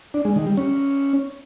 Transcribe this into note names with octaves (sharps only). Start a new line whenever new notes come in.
D4
G#3
D#3
G3
C#4